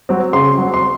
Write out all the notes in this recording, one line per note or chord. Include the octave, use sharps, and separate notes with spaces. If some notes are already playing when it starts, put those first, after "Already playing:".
F#3 C4
C#3 C6
F#3 C4
C6